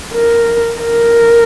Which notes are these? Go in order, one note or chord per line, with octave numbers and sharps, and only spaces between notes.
A#4
A#4